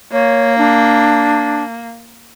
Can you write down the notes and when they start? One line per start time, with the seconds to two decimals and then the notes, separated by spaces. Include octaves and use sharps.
0.12 A#3 C#5
0.58 D4